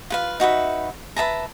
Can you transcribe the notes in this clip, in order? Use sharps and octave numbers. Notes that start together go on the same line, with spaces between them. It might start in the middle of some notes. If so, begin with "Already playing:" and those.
F4 B4 F5
D#4 F#4 B4 E5
B4 E5 A5 A#5